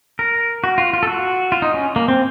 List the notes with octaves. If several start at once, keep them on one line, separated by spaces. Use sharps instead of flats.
A#4
F#4
F4
F4
A4
F#4
F4
D#4
C#4
A#3
C4